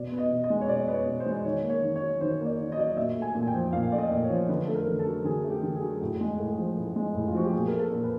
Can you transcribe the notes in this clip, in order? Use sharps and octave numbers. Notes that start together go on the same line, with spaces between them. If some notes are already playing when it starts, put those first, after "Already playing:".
Already playing: B2 D5
B3
D#5
B2
D#5
G#3
C#5
B2 D5
B3
C#5
B2
C5
G#3
D#3 C#5
A#3
C#5
D#3
C#5
F#3
D#3 C5
A#3
D5
D#3
D#5
F#3 D5
D#5
A#2 E5
A3
G#5
A#2
G#5
G5
F3
A#2 F5
A3 D5
D#5
A#2
C#5
F3
D3 B4
A3 A4
A#4
D3
A4
F#3
D3 G#4
A3
G4
D3
G#4
F#3
A2
G#3
A2
F3
A2
G#3
A2
F4
F3 F#4
G4
A#2 G#4
A3 A#4
A4
A#2
B4